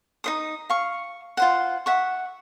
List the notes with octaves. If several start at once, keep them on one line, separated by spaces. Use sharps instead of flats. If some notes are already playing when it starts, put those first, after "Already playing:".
D#4 C5 D#6
F5 C#6
F4 C5 F#5
E5 F#5 C#6